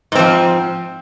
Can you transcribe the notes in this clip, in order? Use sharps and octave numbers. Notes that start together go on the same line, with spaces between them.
G#2 F3 C4